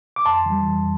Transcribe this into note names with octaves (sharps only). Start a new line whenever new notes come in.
D6
F2 A5 C6
E3 G3
F2